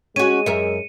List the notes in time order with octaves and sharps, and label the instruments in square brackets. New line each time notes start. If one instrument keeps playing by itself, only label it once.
[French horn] G#3 [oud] C#4 F#4 [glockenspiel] D#7
[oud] F#2 A#4 E5 [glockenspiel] C#7